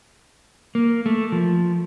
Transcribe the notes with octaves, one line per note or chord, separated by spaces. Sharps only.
A#3
A3
F3